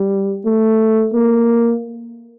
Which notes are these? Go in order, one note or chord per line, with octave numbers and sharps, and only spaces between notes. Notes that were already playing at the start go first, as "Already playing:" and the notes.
Already playing: G3
A3
A#3